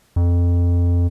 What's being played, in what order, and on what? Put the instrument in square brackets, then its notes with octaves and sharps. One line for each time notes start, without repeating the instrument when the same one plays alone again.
[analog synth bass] F2